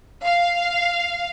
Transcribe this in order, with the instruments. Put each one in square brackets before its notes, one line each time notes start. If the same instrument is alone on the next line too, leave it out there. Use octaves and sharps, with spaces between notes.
[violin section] F5